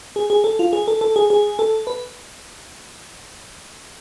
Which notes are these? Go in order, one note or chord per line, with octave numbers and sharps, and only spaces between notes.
G#4
G#4
A4
F4
G#4
A4
A4
G#4
G#4
A4
B4